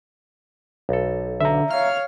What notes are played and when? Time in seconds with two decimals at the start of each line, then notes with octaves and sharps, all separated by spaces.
0.89 B1 A4
1.41 D3 E5 A#5
1.70 C#5 F5 F6